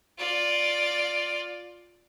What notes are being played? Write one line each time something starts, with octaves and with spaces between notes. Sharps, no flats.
F4 D5